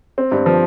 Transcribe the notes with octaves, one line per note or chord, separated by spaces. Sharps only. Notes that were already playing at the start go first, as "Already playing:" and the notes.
C4
G2
F3